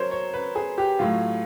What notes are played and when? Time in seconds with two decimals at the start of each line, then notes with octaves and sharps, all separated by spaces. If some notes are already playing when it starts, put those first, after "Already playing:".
Already playing: F#3 A#4 C5 C#5
0.11 C#5
0.33 B4
0.55 G#4
0.78 G4
0.99 A2 F#3 F4